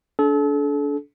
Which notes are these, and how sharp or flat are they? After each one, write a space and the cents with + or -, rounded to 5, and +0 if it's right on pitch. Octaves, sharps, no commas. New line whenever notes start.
D4 -30 A4 -35